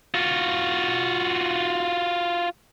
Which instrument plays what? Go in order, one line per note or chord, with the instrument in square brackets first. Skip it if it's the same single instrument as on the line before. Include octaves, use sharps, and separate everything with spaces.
[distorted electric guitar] F4 F#4